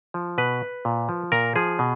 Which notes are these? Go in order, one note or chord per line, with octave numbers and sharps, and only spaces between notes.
F3
B2 B4
A#2
F3
A#2 A#4
F3 G#4
B2